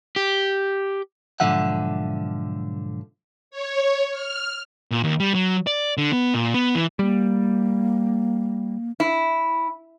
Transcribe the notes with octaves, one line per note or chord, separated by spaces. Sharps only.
G4
B1 G#2 D3 F3 E5 F#5
C#5
F6
A#2
D#2
G3
F#3
D5
D3
B3
A#2
B3
E3
G3 A#3
E4